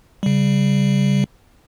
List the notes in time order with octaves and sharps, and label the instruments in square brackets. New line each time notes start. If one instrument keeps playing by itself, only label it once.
[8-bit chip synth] C#3 G3